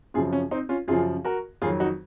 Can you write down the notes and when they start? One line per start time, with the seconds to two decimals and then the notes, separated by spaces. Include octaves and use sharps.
0.14 F#2 C#3 F3 F4 G#4
0.33 C#4
0.51 C4 D#4
0.69 C#4 F4
0.88 F#2 C#3 F3 F4 G#4
1.25 F#4 A#4
1.62 F2 D#3 F#3 F4 G#4
1.80 D#4 F#4